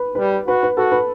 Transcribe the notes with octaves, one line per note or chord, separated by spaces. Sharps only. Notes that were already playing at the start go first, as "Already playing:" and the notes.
Already playing: B4
G3 B4
F#4 B4
B4
F#4 A4
B4